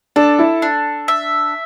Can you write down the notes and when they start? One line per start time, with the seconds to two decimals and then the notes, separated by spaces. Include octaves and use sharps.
0.16 D4 A4
0.39 E4
0.62 D4
1.08 E5